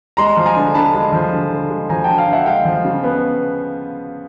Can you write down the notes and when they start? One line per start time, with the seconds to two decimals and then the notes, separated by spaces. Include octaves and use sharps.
0.17 G#3 A#5 C6
0.37 F3
0.46 G#5 A#5
0.56 D3
0.74 D3 A5 B5
0.95 G#3
1.12 F3
1.33 D3
1.51 D3
1.70 G#3
1.89 F3 G#5 A#5
2.04 D3 G5 A5
2.18 F5 G5
2.28 D3 E5 F#5
2.46 G#3 F5 G5
2.65 F3
2.85 C#3
3.04 B3